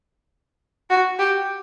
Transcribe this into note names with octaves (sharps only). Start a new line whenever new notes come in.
F#4
G4